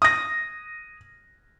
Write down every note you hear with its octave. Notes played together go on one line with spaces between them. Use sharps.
D#6 A#6